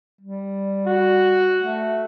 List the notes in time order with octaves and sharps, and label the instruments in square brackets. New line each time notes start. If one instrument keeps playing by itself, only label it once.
[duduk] G3
[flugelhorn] F#4
[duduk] A3